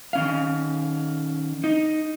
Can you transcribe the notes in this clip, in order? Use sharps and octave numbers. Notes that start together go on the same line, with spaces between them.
D#3 C#4 F5
D#4